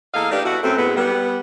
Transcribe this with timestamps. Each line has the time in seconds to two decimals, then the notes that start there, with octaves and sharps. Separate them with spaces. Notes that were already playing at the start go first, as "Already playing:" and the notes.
0.14 E2 A#3 A4 D#5 F5
0.31 A3 D4 D#4 G4 B4 D5
0.44 B2 G3 E4 F#4
0.64 F#2 A3 C4
0.78 A2 G#3 B3
0.97 G3 B3